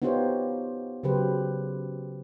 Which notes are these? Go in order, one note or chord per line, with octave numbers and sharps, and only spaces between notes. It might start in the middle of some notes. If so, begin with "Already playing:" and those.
B3 D#4 F4 G4 C5 C#5
C#3 F#3 G4 B4 C5